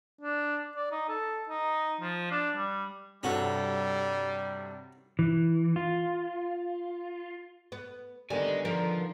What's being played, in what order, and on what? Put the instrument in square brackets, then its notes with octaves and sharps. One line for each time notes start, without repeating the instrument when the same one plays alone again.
[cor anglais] D4
D5
D#4
A4
D#4
F3
D4
G3
[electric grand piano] G2 C3 A4 [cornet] G3 [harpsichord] C#4 F#4
[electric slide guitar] E3
F4
[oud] B3
[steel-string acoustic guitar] D3 D#3 B3 [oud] G3 [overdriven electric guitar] D#5 G#5
[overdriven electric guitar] F3 [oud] A#4